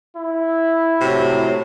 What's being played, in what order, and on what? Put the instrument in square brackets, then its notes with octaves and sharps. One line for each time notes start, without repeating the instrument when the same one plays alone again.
[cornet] E4
[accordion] A2 F#3 [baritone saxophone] C3